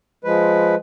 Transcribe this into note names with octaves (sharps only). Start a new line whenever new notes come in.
F3 G#3 B4